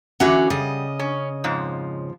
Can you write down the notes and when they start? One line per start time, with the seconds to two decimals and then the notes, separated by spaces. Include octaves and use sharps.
0.20 D3 E3 C#4 F#4 F#5
0.50 C#3 G3 D#5
1.00 C#4
1.44 F2 G#2 F3